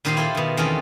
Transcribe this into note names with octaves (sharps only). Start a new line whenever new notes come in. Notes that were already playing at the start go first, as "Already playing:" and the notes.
A#2 D#3 D#4 G4 C5 F5
E4 F4 G4 A4 A5 C6
B2 D#3
E2 D#3 A3 C4 C#4 F4